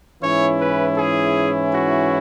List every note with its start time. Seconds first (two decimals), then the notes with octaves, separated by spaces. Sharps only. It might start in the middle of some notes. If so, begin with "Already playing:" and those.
0.22 G#2 E3 C#4 E4 C#5
0.60 B4
0.98 G#4
1.73 F#4